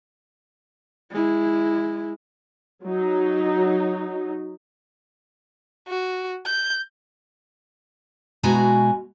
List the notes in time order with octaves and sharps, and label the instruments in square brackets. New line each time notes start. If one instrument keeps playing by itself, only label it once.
[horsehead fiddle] G#3 E4
[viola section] F#3 D#4
[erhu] F#4
G6
[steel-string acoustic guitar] B2 G#3 E4 F#4 G#5 A#5